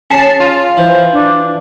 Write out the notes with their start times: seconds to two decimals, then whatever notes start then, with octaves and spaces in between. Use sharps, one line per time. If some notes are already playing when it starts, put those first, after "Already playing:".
0.10 C#4 G#4 A5 C7
0.40 F4
0.77 E3 C5
1.13 D4